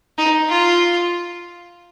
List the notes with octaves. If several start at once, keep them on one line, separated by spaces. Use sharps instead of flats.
D#4
F4